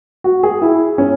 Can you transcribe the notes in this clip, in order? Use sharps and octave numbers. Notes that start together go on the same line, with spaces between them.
F#4
G#4
E4
C#4